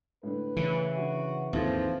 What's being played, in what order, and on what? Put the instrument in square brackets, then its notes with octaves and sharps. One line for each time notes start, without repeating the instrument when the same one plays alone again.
[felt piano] A2 D3 [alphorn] B4
[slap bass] C#3 [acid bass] E3
[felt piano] D3 [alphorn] F#4
[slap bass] D#2 G#2 [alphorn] F3 [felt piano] C4 E4 A4